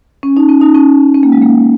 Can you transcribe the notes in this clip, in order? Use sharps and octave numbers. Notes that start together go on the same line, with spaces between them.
C#4
D#4
C#4
D#4
C#4
C#4
A#3
G#3
A#3